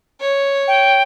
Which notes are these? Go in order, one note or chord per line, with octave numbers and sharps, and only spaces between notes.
C#5
G5